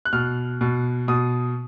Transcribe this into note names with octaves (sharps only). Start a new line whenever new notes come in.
F#6
B2 F6
B2
B2 D#6